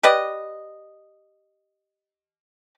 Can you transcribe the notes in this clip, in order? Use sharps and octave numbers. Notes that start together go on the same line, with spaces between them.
G4 B4 D5 D#5